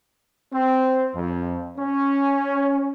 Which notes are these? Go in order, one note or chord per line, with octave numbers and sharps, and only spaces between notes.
C4
F2
C#4